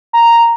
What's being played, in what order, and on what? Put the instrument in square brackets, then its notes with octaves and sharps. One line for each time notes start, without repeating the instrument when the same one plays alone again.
[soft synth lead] A#5